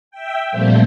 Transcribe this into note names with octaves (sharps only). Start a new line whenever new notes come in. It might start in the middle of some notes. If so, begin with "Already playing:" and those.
E5 G5
A#2 F3 G3 A3 A#3 C4